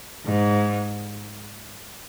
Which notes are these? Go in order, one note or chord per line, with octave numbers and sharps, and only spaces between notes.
G#2